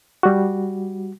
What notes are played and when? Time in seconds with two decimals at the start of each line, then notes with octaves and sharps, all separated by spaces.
0.23 G3 F#4